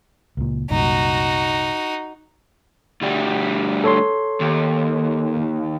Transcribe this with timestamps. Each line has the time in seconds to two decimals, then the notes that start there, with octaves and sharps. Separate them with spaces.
0.37 C#2 A#2
0.70 C2 F#2 A#2 D#4 F#4
3.02 D2 G3
3.84 A4 C#5 C6
4.40 D#2